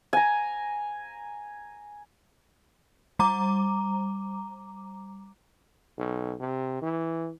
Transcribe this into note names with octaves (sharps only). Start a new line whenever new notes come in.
G#5 A#5
G3 A#5 D6
B1
C3
E3